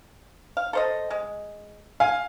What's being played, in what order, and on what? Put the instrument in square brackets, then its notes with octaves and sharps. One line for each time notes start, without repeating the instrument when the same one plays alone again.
[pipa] F5
A4 C5 D#5
G#3
[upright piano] F5 [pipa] G#5